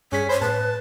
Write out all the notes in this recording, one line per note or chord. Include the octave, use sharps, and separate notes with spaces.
G2 C#4 G#4 B6
C5 C#5 B5
A2 B4 A5